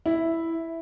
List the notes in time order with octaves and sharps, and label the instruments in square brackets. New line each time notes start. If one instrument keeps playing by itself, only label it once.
[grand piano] E4